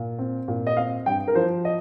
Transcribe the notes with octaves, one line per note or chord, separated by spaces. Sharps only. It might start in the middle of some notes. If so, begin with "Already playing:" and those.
Already playing: A#2
C4
A#2
D#5
C4 F5
G2 G5
A#4
F3 C5
D#5